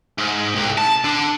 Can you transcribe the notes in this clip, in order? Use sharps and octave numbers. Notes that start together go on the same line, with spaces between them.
G#2
C2
A5
D3 D4